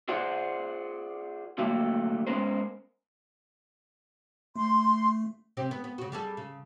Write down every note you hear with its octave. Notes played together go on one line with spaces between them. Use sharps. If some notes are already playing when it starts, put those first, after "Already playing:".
F4 G#4 C5 D5 F#5
D3 F#3 G3 A3 A#3
G#3 B3 C#4 A#4 C5
A3 C6
C3 C4 G4
B3
B3
C#3 F#4
G3 G#4 A4
C#3